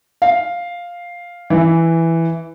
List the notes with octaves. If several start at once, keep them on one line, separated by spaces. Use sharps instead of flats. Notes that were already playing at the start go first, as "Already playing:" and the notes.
F5
E3